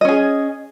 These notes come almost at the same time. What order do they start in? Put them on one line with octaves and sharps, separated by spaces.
D#5 C#4 G#4